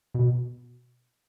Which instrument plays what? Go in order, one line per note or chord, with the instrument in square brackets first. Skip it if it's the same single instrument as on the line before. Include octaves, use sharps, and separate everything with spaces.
[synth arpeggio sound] B2